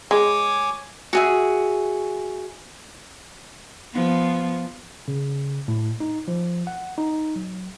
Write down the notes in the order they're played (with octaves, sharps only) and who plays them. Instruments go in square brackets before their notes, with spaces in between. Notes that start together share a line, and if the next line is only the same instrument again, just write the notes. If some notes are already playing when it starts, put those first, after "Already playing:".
[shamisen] G#3 [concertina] C#5 G#5 D6
[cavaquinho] F#4 G#4 E5
[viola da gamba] F3 B3
[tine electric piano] C#3
A2
D#4
F3
F#5
D#4
F#3